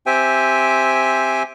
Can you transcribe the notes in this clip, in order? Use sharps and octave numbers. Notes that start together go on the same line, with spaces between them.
C4 G4 C5 E5 G5 G#5